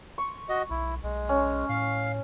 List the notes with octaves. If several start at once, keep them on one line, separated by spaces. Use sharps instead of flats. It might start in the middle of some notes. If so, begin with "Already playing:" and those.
C#6
F#4 D#5
B1 E4
B1 G#3
C#4
A2 F5